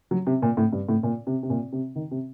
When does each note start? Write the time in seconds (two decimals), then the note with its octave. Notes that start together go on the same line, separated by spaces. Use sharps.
0.11 F#3
0.27 C3
0.42 A#2
0.57 A2
0.72 G2
0.89 A2
1.03 A#2
1.27 C3
1.43 C3
1.50 A#2
1.72 C3
1.96 D#3
2.11 C3